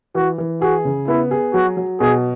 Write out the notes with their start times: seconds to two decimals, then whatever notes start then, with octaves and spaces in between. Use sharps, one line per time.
0.15 E3 F#4
0.38 E3
0.62 F#4 G#4
0.85 C#3
1.08 B3 E4
1.31 G#4
1.53 F#3 F#4
1.77 F#3
2.00 B2 G#4